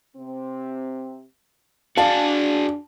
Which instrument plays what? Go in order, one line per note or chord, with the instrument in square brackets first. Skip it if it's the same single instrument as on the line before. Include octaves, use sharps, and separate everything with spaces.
[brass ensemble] C3 C4
[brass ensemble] D4 [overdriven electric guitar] F#4 G#4 [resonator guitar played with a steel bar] D5 F5 [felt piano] A5